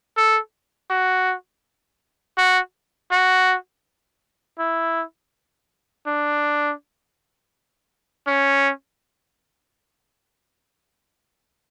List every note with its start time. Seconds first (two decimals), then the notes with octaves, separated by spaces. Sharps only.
0.17 A4
0.90 F#4
2.38 F#4
3.12 F#4
4.59 E4
6.07 D4
8.27 C#4